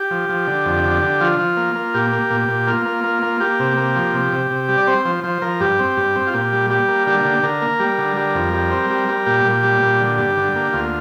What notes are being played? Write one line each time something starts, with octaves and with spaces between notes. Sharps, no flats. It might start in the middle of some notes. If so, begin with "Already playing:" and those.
Already playing: G4
F3
F3
D3
F2
D3
D3
F3 F4
F3
A#3
A#3
A#2 G4
A#3
A#2
A#2
A#3 F4
A#3
A#3
A#3
A#3 G4
C3
A#3
F3
C3
C3
C3
G3
D5
C4 C5
F3 C5
F3 C5
F3 A#4
G2 G4
C4
G2
C4
F4
A#2 G4
G3
G3 G4
A#3
D3 G4
D3
D3 A#4
A#3
G3
D3
G3
F2
G3
C4
G3
G3
A#2 G4
A#2
G3
A#2
D3
G2
D3
A#3
D2 F4